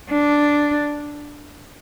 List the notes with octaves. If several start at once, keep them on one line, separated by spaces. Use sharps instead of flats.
D4